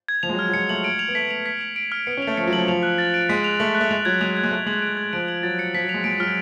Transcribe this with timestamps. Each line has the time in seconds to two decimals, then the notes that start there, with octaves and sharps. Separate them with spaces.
0.08 G#6
0.23 F3 F7
0.29 G#3
0.33 F#3
0.39 F6
0.49 F#3
0.54 G#3 C#7
0.69 A3 F#7
0.84 D7
0.99 F7
1.08 B3
1.15 A3 B6
1.31 F7
1.46 B6
1.61 F7
1.76 D7
1.92 F6
2.07 B3 C#7
2.17 C#4
2.22 F7
2.27 A3
2.37 F3 C#7
2.47 F#3
2.53 F3 F#7
2.68 F3 F7
2.83 F#6
2.98 A6
3.14 D7
3.29 G#3 B6
3.44 F7
3.60 A3 F#7
3.75 F#6
3.81 A3
3.91 G#3 F7
4.05 F#3 G#6
4.21 G#3 F7
4.37 G#6
4.44 G#3
4.51 A3 D7
4.66 G#3 F#7
4.82 D7
4.97 G#6
5.13 F3 D7
5.28 F#7
5.43 F#3 A6
5.59 C#7
5.74 F3 B6
5.84 F#3
5.89 G#3 F7
6.04 G#3 D7
6.20 F#3 F6